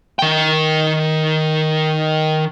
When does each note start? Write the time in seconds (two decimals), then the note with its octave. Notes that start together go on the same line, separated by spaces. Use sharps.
0.19 D#3 G5